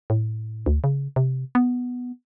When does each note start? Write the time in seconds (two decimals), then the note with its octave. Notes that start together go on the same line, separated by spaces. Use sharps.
0.10 A2
0.66 D2
0.84 C#3
1.16 C3
1.55 B3